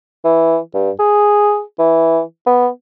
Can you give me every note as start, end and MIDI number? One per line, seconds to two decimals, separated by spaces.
0.25 0.58 52
0.74 0.91 43
1.00 1.62 68
1.79 2.21 52
2.47 2.68 59